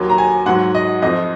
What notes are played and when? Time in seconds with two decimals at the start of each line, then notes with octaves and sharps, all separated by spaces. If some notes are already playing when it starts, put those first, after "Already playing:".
Already playing: D#2 D#3 F#3
0.09 A#5
0.18 G#5
0.46 G#2 F#3 F#5
0.75 D#5
1.02 F2 F3 D#5